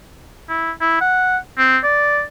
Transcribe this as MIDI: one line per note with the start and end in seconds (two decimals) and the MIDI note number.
0.49 0.71 64
0.81 0.99 64
1.01 1.37 78
1.58 1.78 60
1.84 2.22 74